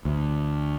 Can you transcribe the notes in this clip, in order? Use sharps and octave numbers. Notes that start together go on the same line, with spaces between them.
D2